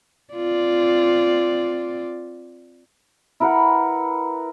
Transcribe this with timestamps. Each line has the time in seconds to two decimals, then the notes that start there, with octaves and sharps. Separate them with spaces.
0.34 C4 F4 D5
3.40 E4 A#4 B4 F#5